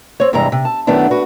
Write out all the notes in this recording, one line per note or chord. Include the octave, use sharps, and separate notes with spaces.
C4 C#5
E2 G2 C3 E3 G#3 A#5
C3
A5
F#2 D#3 A3 B3 D4 E4
F#4 B4